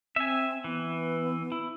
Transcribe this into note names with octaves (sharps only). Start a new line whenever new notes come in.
C4 E5 G#5
E3 B3
E4